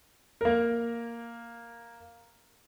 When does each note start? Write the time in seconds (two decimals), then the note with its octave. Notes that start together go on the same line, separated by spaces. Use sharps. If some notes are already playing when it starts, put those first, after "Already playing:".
0.41 A#3 A#4